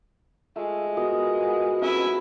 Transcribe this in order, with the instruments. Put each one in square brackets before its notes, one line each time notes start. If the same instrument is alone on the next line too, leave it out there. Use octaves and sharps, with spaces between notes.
[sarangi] G#3 [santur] A3 [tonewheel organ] F4 E5
[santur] B3 F#4 D#5 [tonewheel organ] F4 A#4
[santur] F#4 B4
[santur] A3 [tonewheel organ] C4 C#4 F4 [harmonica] E4 B4